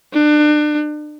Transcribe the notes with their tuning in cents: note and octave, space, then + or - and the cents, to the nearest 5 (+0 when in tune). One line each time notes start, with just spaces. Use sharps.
D4 +30